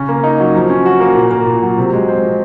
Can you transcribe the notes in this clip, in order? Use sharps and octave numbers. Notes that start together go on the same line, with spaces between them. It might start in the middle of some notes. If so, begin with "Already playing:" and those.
Already playing: C#3 C#4
A#3
D#4
F#3
F3
C#4
F#4
A#3
A#2
A#3
A#2
F#3
C3
G#3
C4
F3